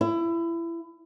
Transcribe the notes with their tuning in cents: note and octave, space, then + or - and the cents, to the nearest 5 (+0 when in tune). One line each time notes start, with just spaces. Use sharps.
E4 +25